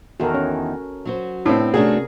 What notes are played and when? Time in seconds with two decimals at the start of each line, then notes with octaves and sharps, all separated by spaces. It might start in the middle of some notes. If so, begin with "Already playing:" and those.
0.20 E2 D#3 F#4 A4 A#4
0.34 C#4 C#5
1.05 F#3 F#4 C5
1.46 A2 B3 C4 D4
1.74 C3 A3 C#4 D4 F#4 G#4 A#4